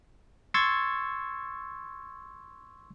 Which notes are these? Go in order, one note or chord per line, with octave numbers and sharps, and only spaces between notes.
C6 C#6 E6 G#6 A6